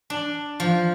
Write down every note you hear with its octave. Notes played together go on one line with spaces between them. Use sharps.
D4
F3